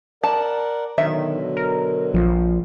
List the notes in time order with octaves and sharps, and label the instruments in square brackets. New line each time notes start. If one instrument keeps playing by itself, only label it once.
[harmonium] A#4 D5 F#5 [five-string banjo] A5
[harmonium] B2 D3 F#3 [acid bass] D#3 [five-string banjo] E5
[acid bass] A#4
[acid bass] A#1 [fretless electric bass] F3